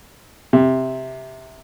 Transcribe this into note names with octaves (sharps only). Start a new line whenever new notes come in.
C3